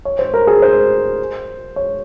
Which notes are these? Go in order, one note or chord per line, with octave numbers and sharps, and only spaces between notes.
C#5
C5
A#4
G#4
C5
C#5